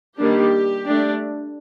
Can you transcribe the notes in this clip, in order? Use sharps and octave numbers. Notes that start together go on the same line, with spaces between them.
D#3 G3 A#3 D4 G4
A3 D4